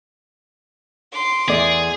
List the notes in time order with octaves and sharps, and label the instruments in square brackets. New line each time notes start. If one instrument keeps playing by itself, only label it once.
[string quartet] C6 D6
[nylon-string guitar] E2 D5 [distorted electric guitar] G#4